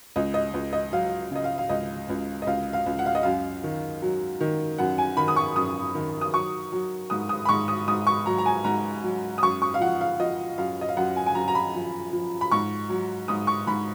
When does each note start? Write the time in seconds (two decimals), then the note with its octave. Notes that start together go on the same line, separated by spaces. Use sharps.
0.16 C#2 D#5
0.34 D#5
0.54 C#2
0.73 D#5
0.92 F#3 F5
1.31 C#3 D#5
1.44 F5
1.58 F5
1.69 C#2 D#5
2.09 C#2
2.42 D#5
2.47 C#2 F5
2.73 F5
2.86 C#2
2.99 F#5
3.06 F5
3.15 D#5
3.23 F#2 F5
3.64 D#3
4.02 F#3
4.40 D#3
4.78 F#2 F#5
4.98 G#5
5.17 D#3 B5
5.28 D#6
5.36 C#6
5.56 F#2 D#6
5.94 D#3
6.21 D#6
6.33 F#3 C#6
6.72 F#3
7.10 G#2 D#6
7.29 D#6
7.45 B5
7.49 G#2 C#6
7.68 D#6
7.88 G#2 D#6
8.07 C#6
8.26 F#3 A#5
8.38 A#5
8.46 G#5
8.64 G#2 A#5
9.04 F#3
9.38 D#6
9.42 F#2 C#6
9.62 C#6
9.74 F5
9.80 F3 F#5
10.01 F5
10.20 F3 D#5
10.58 F#2 F5
10.81 D#5
10.89 F5
10.97 F#2 F#5
11.16 G#5
11.26 G#5
11.35 F#2 A#5
11.48 A#5
11.55 B5
11.75 F3
12.13 F3
12.41 B5
12.51 G#2 C#6
12.89 F#3
13.28 G#2 D#6
13.47 C#6
13.67 G#2 B5